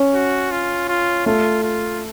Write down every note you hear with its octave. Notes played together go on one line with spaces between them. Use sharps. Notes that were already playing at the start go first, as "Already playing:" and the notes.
Already playing: C#4
F#4
F4
F4
A3 F4
F4